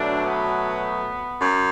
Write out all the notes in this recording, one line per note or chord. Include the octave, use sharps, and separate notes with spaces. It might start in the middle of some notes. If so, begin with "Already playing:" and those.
Already playing: B2 F#3 A3 D4
B3
F#2